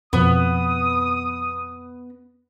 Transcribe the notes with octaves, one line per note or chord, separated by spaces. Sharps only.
F2 B2 F3 B3 D#6